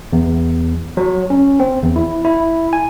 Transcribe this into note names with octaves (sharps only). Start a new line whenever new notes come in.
E2
F#3
C#4
C4
E2
E4
E4
G#5